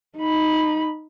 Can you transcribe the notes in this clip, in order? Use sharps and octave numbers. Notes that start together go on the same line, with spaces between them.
D#4 B5